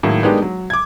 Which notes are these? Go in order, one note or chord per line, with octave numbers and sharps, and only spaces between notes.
A2 D#3 F#3 G#3 A#3
G#3 A#3 B3 D4 D#4 G4
F#3
D6 G#6